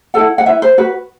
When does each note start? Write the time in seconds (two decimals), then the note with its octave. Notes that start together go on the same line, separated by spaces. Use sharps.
0.14 E4 A4 F#5
0.38 F#5
0.46 E4 B4 E5
0.62 C5
0.78 F#4 B4